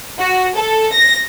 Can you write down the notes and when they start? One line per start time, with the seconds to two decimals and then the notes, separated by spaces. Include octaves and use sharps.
0.20 F#4
0.57 A4
0.92 A#6